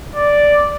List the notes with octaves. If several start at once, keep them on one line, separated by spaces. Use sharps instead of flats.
D5